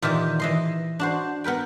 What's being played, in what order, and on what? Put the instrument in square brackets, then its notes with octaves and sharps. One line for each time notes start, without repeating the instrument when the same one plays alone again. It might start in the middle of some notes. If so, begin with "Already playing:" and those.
[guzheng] A#2 D#3 E3 F4 G4
E3 D#5 C6
D4 F#4 C5
B3 A#4 B4 G5